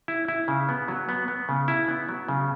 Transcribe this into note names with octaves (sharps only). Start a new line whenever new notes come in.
E4
E4
C#3
B3
F#3
B3
B3
C#3
E4
B3
F#3
C#3